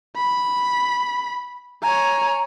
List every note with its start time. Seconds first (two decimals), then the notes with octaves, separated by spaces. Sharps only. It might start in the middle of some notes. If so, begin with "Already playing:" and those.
0.16 B5
1.83 C#5 G#5 A#5